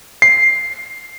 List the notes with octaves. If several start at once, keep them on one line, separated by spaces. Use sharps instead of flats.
C7